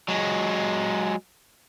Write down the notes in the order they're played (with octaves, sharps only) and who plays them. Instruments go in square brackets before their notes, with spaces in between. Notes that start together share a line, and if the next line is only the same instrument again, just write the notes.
[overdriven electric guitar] F#3 G#3